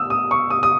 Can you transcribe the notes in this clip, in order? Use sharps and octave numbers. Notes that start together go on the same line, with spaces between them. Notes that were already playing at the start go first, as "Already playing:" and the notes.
Already playing: D#6 E6
D#6
C#6
D#6
D#6